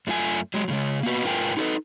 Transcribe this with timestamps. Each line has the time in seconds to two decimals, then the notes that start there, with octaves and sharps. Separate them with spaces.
0.07 F#2 A3 F4 F#4 G#5
0.54 F#3 G#3
0.68 A2 C#3 G#3
1.03 A#3 B3 F#4 B4
1.25 G#2 F4 A#4 B4 G5 G#5
1.57 D#4 F#4 G#4 A4 B4